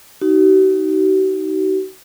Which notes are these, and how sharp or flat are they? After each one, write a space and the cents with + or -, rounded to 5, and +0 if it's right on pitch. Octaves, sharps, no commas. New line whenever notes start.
D#4 +10 F#4 +45